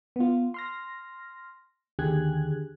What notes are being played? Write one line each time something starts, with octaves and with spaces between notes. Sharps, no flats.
B3 F4
C6 F6 A#6
D#2 D3 G4 G#4 F#6 G#6